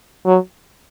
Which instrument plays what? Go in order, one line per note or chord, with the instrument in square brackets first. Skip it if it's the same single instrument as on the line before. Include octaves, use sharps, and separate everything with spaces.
[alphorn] F#3